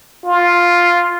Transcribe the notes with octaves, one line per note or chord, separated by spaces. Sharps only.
F4